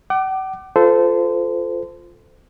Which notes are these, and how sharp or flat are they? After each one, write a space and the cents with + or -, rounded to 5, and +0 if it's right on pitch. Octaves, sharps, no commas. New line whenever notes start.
F#5 +45 D6 +15
F4 +0 A4 +0 C5 -25